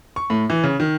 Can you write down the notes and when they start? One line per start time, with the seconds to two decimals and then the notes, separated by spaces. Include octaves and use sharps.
0.16 C#6
0.30 A2
0.50 E3
0.64 C#3
0.80 D#3